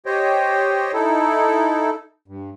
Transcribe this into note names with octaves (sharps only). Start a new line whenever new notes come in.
G4 C5 C#5 D#5 G5
D#4 E4 A4
G2